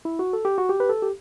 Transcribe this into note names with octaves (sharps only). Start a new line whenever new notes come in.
E4
F#4
A4
G4
F#4
G4
B4
A4
G4